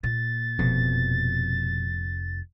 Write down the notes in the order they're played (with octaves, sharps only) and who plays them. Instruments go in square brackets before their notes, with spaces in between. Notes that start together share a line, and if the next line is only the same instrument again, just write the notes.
[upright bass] A#2 [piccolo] A6
[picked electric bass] F1 F2 [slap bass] B2